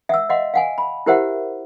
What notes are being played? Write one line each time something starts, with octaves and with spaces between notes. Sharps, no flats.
E5 F#5 E6
D#5 F5 F#5 C6
F5 F#5 G#5
B5
E4 G4 A#4 C5 E5 F#5